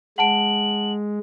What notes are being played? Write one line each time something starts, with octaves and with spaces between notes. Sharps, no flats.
G#3 F#5 A5 D7 F#7